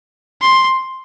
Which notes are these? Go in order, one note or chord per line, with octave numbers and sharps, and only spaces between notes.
C6